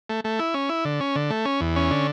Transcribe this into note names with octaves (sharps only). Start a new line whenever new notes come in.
A3
A3
E4
C#4
E4
D3
C#4
D3
A3
C#4
E2
C#4
D3